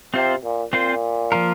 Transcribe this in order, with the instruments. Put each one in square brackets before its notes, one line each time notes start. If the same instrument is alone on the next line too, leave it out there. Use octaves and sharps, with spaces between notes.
[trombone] C3 [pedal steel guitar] C4 F4 C5
[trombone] A#2
[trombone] A#2 [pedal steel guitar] C4 F4 C5
[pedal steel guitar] F3 A#3 F4 A#4